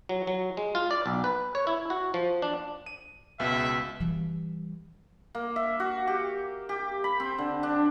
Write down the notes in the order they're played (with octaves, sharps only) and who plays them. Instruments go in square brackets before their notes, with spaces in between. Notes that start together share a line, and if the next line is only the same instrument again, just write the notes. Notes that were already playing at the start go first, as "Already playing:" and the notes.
[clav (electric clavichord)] F#3
F#3
G#3
F4
D5
B1
B4
C#5
E4
F#4
F3
D4
[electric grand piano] D#7
[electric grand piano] C#2 B2 [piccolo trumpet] E5
[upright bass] E3 G3
[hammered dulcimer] A#3
E5
F#4
G4
G4
B5
C4
D3
D4